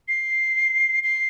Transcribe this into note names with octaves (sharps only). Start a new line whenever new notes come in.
C7
C7